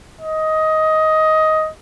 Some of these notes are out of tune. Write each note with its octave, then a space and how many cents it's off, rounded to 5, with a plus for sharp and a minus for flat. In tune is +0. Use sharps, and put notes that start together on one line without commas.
D#5 +15